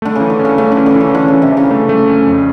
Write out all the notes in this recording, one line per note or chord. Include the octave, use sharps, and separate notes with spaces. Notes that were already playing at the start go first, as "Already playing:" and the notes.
D3 A3
C#3
E3
D3
C#4
C#3
C#3 A3
D3
E3
D3
E3
C#3
D3 E3
C#3
E3
C3
E3
C#3
A3
A3
C#4
F2